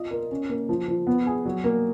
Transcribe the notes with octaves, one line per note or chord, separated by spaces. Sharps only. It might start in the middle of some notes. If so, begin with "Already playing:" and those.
Already playing: F4 D#5
A#4
C#4
A#3
F3
F3
B3
G#4
F#3
A#3